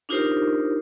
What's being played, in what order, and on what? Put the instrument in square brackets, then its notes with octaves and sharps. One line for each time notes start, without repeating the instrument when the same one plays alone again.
[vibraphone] D4 D#4 F4 G4 A#4 C5